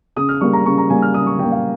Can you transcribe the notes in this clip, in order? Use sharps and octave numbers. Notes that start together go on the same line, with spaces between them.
C#3 D#6
F6
G3 A#3 C#6
A#5
C#3 C#6
A#5
G3 A#3 G#5
F6
C#3 D#6
C#6
G3 A#3 G5
F5